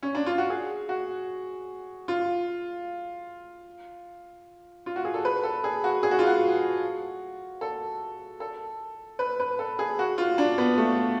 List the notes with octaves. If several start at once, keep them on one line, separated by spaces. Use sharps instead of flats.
C#4
D4
F4
F#4
G#4
F#4
F4
F4
F#4
G#4
A4
B4
A4
G#4
F#4
G#4
F#4
F4
F#4
A4
A4
B4
B4
A4
G#4
F#4
F4
D4
B3
A3